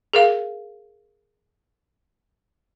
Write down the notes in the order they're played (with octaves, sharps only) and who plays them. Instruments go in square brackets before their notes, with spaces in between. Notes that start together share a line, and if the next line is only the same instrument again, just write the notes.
[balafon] G#4 A#4 F5